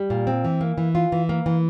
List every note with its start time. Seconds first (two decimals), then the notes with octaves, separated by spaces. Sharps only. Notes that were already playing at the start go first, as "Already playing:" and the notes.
Already playing: G3
0.10 A#2
0.27 C4
0.44 E3
0.61 A#3
0.78 E3
0.95 F4
1.12 E3
1.29 A#3
1.46 E3